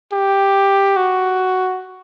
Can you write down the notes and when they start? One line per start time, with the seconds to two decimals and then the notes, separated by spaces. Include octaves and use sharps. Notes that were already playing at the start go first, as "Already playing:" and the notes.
0.13 G4
0.97 F#4